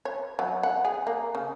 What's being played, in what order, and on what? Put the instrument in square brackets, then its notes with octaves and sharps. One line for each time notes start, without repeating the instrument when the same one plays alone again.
[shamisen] C#5
F#3
F#5
G#4
A#3
C#3